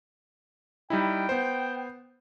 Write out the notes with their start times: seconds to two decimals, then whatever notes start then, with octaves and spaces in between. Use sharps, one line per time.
0.90 G3 D#4 E4 G5
1.29 B3 C5